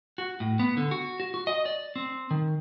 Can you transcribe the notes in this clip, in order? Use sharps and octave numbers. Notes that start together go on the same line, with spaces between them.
F#4
A2
B3
D3
F#4
F#4
F#4
D#5
D5
C4
D#3